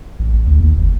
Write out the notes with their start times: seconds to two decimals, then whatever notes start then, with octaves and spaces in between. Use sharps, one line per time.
0.19 A1
0.33 A1
0.47 D2
0.60 D#2
0.76 F#1